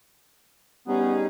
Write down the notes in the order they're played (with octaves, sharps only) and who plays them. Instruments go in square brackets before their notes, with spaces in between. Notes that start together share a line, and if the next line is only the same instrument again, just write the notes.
[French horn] G3 [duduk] B3 [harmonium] C#4 D#4 G#4